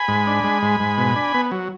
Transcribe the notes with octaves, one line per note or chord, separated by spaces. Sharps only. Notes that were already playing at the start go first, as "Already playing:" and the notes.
Already playing: G#5 B5
G#2
D4
G#3
G#2
G#2
B2
D4
B3
F#3